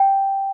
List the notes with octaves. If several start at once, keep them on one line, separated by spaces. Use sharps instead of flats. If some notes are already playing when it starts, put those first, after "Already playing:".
Already playing: G5